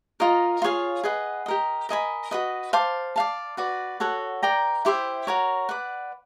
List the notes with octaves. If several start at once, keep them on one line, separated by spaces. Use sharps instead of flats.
F4 A#4 D#5
F4 G#4 C#5 F5
G#4 B4 D#5 F#5
G4 A#4 D#5
A#4 D#5 G#5 B5
F#4 B4 D#5
C5 F5 A5 D6
D5 F5 A5
F#4 B4 D5
F#4 A4 C#5 F#5
A#4 D5 G5 A#5
E4 G4 C5 E5
F#4 A#4 C#5
B4 D5 F#5